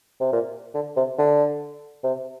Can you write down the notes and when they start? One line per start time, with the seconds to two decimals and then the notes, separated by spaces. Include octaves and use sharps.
0.21 C3
0.32 A#2
0.75 D3
0.96 C3
1.19 D3
2.04 C3